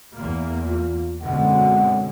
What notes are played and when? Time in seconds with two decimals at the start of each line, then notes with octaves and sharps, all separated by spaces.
0.15 E2 A#3
0.66 F4
1.22 F#2 B2 D3 G#3 C4 F#5